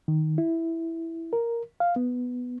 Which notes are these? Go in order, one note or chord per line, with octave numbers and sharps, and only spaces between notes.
D#3
E4
A#4
F5
B3